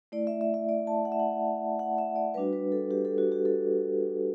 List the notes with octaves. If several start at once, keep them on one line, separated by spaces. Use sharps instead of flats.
A3 E4 D5
E5
E5
E5
D5
A5
F#5
E5
F#5
F#5
E5
D5
G3 D4 F#4 B4
B4
A4
G4
A4
F#4
G4
A4